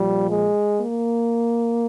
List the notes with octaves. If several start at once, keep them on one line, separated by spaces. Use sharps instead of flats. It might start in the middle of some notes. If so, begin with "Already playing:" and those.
Already playing: A#2 F3 G3
G#3
A#3